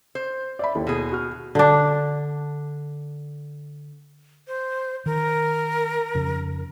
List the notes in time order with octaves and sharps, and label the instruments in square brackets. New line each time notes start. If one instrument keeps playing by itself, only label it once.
[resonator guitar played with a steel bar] C5
[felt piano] D5 E5 B5
D#2 E4 A4
[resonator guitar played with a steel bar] B2 G#4
[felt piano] F#4 F6
[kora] D3 D4
[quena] C5
[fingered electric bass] D#3 [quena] A#4
[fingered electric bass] F2 C#3